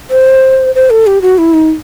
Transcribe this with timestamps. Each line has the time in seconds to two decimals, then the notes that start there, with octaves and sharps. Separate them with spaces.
0.10 C5
0.75 C5
0.90 A4
1.07 G4
1.22 F#4
1.38 E4
1.54 D#4